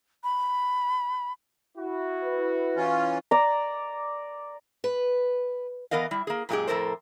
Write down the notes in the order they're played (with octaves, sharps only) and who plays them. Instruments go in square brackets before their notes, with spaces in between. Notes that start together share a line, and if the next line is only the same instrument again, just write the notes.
[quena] B5
[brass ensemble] E4 F#4
[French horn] B4
[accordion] E3 C#4 F4
[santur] D5 A#5
[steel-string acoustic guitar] B4
[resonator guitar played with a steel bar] E3 B3 A#4 D#5 F5
G3 E4
A#3 G#4
F#2 A#2 G#3 A3 G4 G#4
F2 A2 A4 A#4 C5